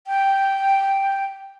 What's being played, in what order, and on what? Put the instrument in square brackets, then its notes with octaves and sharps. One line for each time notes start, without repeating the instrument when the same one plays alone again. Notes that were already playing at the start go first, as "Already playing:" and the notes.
[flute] G5